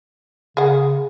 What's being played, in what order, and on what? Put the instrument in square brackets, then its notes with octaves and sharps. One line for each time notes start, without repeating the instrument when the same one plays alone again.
[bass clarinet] C#3 [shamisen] G#4 F#5